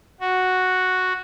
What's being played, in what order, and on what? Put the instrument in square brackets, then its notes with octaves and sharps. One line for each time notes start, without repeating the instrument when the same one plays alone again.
[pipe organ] F#4